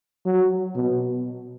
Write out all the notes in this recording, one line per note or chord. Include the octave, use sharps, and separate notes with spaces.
F#3
B2